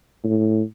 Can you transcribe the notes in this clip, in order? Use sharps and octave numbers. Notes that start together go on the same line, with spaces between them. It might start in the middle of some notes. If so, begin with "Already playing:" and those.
A2